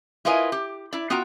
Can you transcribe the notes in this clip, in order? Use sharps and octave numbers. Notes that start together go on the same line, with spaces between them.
E4 F4 A#4 B4 D#5 G#5
G4
E4 D5
B3 F4 F#4 G5 A#5